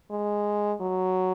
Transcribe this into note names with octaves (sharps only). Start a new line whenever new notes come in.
G#3
F#3